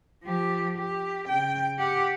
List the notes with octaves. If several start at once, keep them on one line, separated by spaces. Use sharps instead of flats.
F3 G4
G4
C#3 G5
G4 F#5